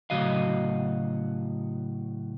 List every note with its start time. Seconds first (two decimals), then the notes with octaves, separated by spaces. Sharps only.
0.10 A2 C#3 F#3 F#4 D#5 F5